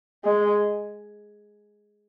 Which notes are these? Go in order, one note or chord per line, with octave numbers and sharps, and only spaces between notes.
G#3